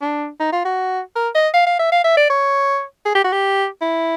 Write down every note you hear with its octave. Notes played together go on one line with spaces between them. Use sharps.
D4
D#4
F4
F#4
A#4
D#5
F5
F5
E5
F5
E5
D5
C#5
G#4
G4
F#4
G4
E4